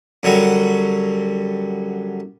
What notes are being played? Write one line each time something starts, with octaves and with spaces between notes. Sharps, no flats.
F#2 D3 F#3 G3